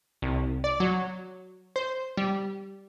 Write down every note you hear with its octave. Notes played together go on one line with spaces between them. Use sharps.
C2
D5
F#3
C5
G3